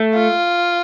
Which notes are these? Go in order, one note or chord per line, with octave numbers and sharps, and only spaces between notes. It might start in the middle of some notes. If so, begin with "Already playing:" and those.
Already playing: A3
F4